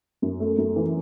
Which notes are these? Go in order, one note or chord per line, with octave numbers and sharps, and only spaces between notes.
F#2
A3
F#2
E3